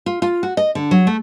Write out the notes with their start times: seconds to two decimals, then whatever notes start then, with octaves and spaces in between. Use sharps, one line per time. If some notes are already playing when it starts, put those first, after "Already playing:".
0.06 F4
0.22 F4
0.43 F#4
0.57 D#5
0.75 D3
0.91 F#3
1.07 A3